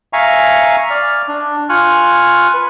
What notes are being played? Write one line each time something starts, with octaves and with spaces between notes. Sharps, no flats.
E5 F5 G#5 A#5 C#6
D5 F6
D4
F4 G#5 C#6 F6 F#6
B4